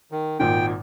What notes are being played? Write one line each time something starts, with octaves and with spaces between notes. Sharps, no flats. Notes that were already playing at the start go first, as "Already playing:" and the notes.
D#3
G#1 A#2 D#3 G5